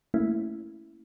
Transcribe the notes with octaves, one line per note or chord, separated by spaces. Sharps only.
A3 A#3 C#4 E4